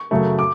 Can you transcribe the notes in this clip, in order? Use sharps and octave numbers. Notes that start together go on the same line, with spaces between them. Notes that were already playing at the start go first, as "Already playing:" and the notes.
Already playing: C#6
F#2 C#3 F#3 A3
D6